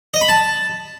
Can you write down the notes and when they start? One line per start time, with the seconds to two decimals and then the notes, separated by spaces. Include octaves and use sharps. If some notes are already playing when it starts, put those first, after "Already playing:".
0.14 D#5
0.21 B5
0.29 A5